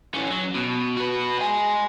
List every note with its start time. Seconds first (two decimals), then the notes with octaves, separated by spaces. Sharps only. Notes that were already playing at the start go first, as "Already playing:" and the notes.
0.14 E3 C#4
0.31 F#3
0.55 B2
0.97 F#4 B4
1.39 D#5 G#5